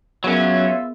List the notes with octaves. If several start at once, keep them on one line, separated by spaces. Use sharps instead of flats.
F#3 B3 C#4 F4 G#4 A#4 B4 E5